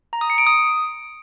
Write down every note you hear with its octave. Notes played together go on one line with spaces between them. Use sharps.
A#5
D#6
C#7
D7
D#6